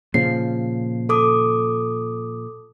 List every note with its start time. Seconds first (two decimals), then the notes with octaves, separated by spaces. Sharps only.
0.14 A#2 C#3 F3 C7
1.09 A4 D6 D#6